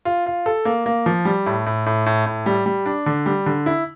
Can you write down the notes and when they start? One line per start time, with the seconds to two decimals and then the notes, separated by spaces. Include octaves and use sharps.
0.05 F4
0.26 F4
0.46 A4
0.65 A#3
0.86 A#3
1.06 F3
1.25 G3
1.46 A2
1.66 A2
1.86 A2
2.06 A2
2.26 A2
2.46 G3
2.66 G3
2.86 D4
3.06 D3
3.26 G3
3.46 D3
3.66 E4